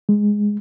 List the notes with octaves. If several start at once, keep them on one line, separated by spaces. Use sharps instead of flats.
G#3